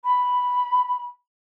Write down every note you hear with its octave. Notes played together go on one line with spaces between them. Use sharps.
B5